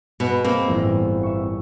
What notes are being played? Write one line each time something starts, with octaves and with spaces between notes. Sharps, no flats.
B2 G#4 D#5 B5
A#3 C4
G1 E2 A2
E5 C#6